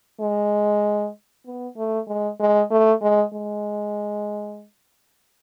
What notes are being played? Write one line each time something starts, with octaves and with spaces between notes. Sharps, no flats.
G#3
B3
A3
G#3
G#3
A3
G#3
G#3